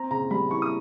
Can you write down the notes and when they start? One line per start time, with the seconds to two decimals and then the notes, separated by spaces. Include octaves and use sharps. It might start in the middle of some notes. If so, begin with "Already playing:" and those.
Already playing: C4 A#5
0.11 C#3 A#5
0.31 G3 B5
0.50 E3 C#6
0.62 D#6